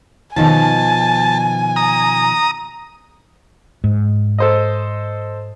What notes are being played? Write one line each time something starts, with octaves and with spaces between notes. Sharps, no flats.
B2 D#3 F3 G#5 A5
A#5 D#6
G#2
A4 C5 D#5